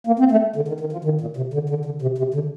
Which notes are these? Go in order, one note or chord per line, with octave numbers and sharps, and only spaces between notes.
A#3
C4
A3
D3
D#3
D#3
F3
D#3
A#2
C3
D3
D3
D3
C3
C3
D3